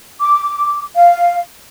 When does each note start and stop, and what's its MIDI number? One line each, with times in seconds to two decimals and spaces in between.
0.20 0.83 86
0.96 1.40 77